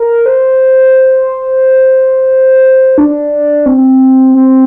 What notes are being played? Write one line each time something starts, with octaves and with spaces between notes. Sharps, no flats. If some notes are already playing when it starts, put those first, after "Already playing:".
Already playing: A#4
C5
D4
C4
C4